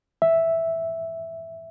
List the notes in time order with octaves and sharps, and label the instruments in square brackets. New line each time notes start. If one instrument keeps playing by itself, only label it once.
[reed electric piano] E5